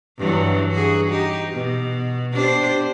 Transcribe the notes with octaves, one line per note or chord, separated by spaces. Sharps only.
G2 E3 F#3
F#4 G#4
D#4 G4
B2
D4 G4 C5